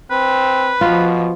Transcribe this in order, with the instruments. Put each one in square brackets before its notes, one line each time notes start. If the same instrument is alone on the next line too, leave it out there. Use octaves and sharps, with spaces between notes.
[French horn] C4 [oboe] B4
[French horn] B2 [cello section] F3 [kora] F4